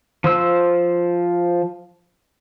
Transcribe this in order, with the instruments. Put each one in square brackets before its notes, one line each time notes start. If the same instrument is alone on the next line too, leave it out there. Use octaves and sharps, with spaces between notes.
[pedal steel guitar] F3 C5 E6